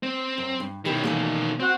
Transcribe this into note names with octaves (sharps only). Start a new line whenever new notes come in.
C4
F#2
G2
B2 D#3 E4 G4 B4
E3 A3 A#3
C4 F#4